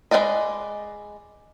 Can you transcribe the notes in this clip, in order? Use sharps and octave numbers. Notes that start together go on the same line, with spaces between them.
G#3 D#4 B4 D5 D#5